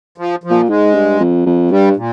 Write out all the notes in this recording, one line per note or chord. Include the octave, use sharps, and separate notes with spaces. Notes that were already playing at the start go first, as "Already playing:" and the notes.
F3
F3
A#2
G#2 G#3
G2
F2
F2
G2 G3
A#2